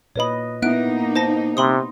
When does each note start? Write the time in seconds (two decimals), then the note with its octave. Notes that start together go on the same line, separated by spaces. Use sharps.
0.16 A#2 B4 C#5 D#5 B5
0.62 A#3 B3 D#4 E4 E5 F#5 F#6 D7
1.16 C5 A5 A#6
1.57 C3 B5 C6 D#6